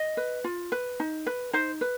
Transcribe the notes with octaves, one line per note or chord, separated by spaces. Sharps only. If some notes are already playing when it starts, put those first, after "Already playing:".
Already playing: D#5
B4
F4
B4
D#4
B4
D#4 C5
B4